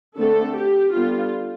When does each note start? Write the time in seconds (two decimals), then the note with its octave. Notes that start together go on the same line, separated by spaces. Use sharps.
0.17 D3 A3 C4 A4
0.55 G4
0.93 D3 G3 B3 F4